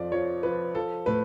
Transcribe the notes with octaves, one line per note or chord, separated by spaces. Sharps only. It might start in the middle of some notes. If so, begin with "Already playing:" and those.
Already playing: F2 F3 D5
F3 C#5
F3 B4
F3 A4
A2 B4